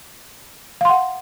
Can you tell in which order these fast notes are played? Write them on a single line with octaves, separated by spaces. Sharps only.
F5 C6 F#5